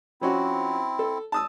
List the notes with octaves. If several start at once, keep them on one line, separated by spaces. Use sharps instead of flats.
F3 C4 C#4 E4 F#4
A4
A5 D#6 E6